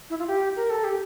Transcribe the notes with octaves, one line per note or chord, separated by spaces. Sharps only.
E4
F4
G4
A#4
A4
G4